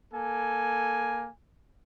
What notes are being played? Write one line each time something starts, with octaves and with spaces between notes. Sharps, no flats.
A#3 A4 G#5